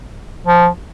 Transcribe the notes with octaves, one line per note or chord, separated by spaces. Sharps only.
F3